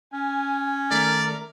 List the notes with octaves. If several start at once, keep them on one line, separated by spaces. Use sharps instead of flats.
C#4 G#5
D#3 A3 A#4 D5